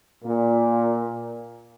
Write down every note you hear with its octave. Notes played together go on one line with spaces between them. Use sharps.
A#2